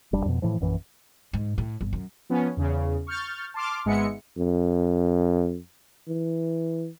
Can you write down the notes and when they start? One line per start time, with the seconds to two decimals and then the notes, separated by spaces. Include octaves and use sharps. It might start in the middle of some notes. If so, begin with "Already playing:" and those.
0.13 F1 G3 D4
0.26 F2 B2
0.42 A2 E3 F3
0.60 A#1 F#2 E3
1.33 G#2
1.58 A2
1.81 G1
1.93 F#2
2.29 F3 B3 C#4
2.57 E2 C#3
3.07 C#6 F6 G6 A6
3.54 A5 C6 D6 F6
3.85 G#1 G#2 G#3 B3 E5 C#7
4.38 F2
6.08 E3